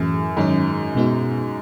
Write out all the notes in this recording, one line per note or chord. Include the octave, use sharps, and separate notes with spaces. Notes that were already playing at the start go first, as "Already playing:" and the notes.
Already playing: F#2 A2 E3 A3 E4 G#4
G#2 D#3 F#3 C#4 G#4
B2 G#3 B3 D#4 F#4